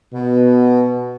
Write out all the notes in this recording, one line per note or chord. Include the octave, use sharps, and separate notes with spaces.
B2